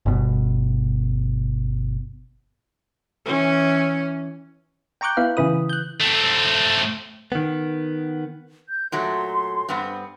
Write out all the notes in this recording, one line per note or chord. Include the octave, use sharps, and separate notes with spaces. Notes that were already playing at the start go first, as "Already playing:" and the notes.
G1 B2
E3 C#4
G5 A#5 C#6 D6 F#6 G6
B3 E4 B4 F5
C#3 E3 E4 B4 D#6
F#6 G6
A3 C4
D#3 B3
G6
A#2 F#3 A3 C6
G2 B3 C4